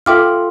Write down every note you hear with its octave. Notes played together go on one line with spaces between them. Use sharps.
F4 A4 E5 G5 D6 F6